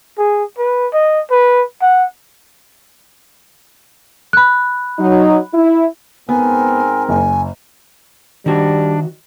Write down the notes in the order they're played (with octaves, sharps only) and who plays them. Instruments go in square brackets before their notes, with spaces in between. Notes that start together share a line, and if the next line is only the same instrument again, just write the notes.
[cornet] G#4
B4
D#5
B4
F#5
[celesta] B5 F#6
[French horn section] F#3 D#4
E4
[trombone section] G#2 C4 A#4 [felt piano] B3 [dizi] G#5
[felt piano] F#1 [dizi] G#5
[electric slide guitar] D#3 F#4 [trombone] G3 [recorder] D4